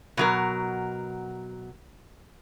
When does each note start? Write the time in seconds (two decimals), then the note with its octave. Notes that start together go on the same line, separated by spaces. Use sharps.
0.17 B2 F#3 A#4